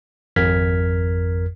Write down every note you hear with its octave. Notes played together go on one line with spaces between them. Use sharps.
G#1 F2 A#4 F6 G#6 B6